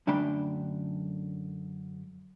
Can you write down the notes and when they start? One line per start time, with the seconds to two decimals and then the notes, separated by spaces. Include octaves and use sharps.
0.07 F#2 D3 A3 D4 G5 B5